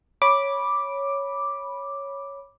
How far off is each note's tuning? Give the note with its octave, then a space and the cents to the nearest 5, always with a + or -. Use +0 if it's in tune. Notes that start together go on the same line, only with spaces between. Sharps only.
C#5 +0 B5 -10 D6 +0